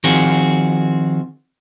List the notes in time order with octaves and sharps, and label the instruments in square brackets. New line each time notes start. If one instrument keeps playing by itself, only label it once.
[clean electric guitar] D#3 F3 C4 F#4 G#4